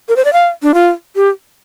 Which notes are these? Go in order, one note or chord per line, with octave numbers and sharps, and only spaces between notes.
A#4
C5
D5
F5
D4
F4
G4